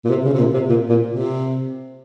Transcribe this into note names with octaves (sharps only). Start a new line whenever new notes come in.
A#2
C3
C#3
C3
A#2
C3
A#2
A#2
C3